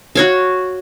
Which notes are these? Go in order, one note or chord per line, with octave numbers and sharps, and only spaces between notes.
F#4 C#5 F5